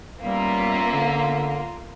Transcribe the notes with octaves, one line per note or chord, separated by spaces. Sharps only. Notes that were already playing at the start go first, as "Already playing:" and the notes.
G3 A#3 B3 C#4 F4 E5
D3